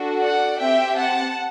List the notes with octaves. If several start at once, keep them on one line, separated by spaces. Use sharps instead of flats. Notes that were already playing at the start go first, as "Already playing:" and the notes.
Already playing: D4 F#4 A4
D5 F#5
C4 G4 E5 G5
F#5 A5